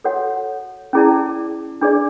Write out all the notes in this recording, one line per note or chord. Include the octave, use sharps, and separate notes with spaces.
F#4 A4 C#5 F#5
C#4 E4 G#4 D5 A5
D4 G#4 D5